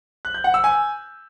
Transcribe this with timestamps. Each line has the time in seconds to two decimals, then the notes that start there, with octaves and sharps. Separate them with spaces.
0.25 F#6
0.34 G6
0.44 F#5
0.54 E6
0.64 G#5